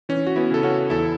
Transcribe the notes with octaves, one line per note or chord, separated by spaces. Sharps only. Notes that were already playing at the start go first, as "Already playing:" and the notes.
E3 C#4
F#4
B3 E4
C#3 A4
C#4 F#4
E2 E4 A4